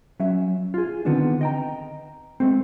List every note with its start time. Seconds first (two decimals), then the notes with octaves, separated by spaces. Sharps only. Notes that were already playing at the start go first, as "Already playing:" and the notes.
0.20 F#3 C#4 E5
0.74 F4 G#4
1.05 D3 D#3 B3 C4 D4
1.41 D#5 G5 A#5
2.40 G#3 A3 C4